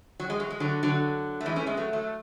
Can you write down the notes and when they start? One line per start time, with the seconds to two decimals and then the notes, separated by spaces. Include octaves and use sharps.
0.20 F#3
0.30 G#3
0.40 F#3
0.50 G#3
0.60 D3 F#3
0.83 D3 F#3
1.41 A3
1.46 E3 G#3
1.56 A3 C#4
1.67 G#3 B3
1.77 F#3 A3
1.93 F#3 A3